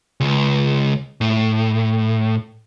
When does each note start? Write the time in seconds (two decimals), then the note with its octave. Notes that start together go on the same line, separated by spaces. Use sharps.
0.20 C#2
1.21 A2